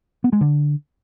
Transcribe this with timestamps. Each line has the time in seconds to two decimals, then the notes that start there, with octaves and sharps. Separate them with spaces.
0.24 B3
0.33 G#3
0.41 D3